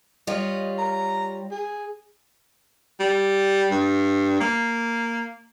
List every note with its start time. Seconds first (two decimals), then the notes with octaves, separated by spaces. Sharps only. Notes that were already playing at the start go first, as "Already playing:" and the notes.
0.27 G3 F4 C#5 D#5
0.78 A#5
1.51 G#4
3.00 G3
3.71 G2
4.40 A#3